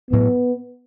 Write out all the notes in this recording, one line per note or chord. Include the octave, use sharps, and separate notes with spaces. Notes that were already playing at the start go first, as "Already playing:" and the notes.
A1 A2 F#3 B3